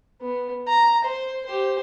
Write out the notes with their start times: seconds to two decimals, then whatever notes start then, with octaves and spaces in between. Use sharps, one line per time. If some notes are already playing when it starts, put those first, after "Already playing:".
0.21 B3
0.68 A#5
1.04 C5
1.45 G4 C5